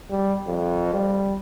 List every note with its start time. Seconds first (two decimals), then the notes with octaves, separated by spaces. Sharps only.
0.10 G3
0.47 F2
0.94 G3